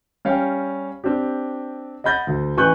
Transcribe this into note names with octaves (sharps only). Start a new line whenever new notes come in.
G3 C#4 C#5 F5 G5
C4 D4 G4
D#5 F#5 B5 G6 A6 A#6
D2
A1 E3 G#5 C#6 F#6 G6